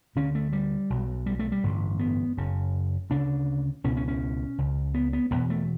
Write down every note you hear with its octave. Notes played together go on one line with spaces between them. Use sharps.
D2 D3 C#4
A3
G3
B1 B2
G3
A3
G3
A1 G2 D3
B3
F#1 F#2 C#3
D2 C#3 D4
C#2 B2 C#4
C#4
C#4
C#2 C#3
B3
B3
E1 E2 B2 B3
A3